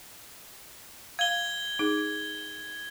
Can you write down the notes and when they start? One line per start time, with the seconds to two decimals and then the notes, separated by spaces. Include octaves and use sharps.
1.19 F5 G#6 G7
1.79 D#4 G#4